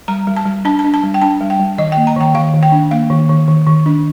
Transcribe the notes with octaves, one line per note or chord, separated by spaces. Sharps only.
G3 A#5
G3
A5
G3
D4 A5
A5
D4
A5
G3
G5
D4 A5
G3
G5
G3
D#3 D#5
G5
A#3
A#5
D#3 G5
D#3 F5
D#3
G5
D4
A#3 F5
D#3
D#3
D#3
D#3
D4